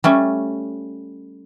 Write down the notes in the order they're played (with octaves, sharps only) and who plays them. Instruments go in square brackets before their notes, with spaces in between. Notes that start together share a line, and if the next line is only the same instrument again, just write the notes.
[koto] G3 A3 C#4